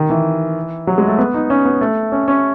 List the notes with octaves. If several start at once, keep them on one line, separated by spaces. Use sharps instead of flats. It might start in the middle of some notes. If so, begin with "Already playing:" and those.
Already playing: D#3
E3
F#3
G#3
A3
B3
D#4
C#4
B3
A3
C#4
C#4